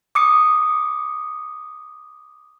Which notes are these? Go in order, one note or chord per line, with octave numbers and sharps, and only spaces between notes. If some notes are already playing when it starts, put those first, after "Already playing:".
D6 D#6 C#7